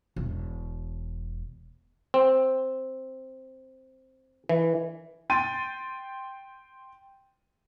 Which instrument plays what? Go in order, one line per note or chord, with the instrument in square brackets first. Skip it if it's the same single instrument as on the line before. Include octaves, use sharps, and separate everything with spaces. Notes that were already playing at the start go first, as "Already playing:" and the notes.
[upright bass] E1
[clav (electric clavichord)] C4
E3
[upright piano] G5 C6 A6 D#7